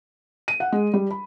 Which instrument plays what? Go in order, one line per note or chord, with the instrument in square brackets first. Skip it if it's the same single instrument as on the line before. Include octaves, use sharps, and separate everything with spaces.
[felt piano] D#7
F#5
G#3
G3
B5